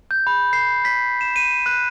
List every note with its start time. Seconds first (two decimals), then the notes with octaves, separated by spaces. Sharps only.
0.11 G6
0.27 B5
0.53 C7
0.85 B6
1.21 E7
1.36 D#7
1.66 F#6